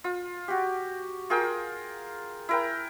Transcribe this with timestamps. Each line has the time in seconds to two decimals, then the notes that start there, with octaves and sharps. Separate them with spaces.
0.04 F4
0.48 F#4 G4
1.30 F4 G#4 A#4 G5
2.49 E4 A#4 G5